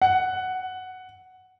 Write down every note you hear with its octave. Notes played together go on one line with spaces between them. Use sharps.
F#5